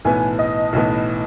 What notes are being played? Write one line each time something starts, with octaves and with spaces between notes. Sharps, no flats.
B1 A2 E3 B3 G#5
D#5
B1 A2 E3 B3